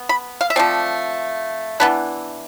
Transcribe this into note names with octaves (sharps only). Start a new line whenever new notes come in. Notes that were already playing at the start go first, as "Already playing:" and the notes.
Already playing: B3
B5
F5
E5
F3 A3 C4 D5
E3 B3 D4 B4